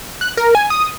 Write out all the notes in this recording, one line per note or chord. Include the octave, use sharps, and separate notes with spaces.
F#6
A#4
G#5
D#6